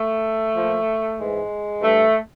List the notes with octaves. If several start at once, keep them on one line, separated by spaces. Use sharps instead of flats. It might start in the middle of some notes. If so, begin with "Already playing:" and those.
Already playing: A3
A#2 F3
G#2 E3 G#3
G2 E3 A3